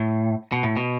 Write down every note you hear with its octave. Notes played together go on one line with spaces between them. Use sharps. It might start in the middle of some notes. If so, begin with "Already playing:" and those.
Already playing: A2
B2
A2
B2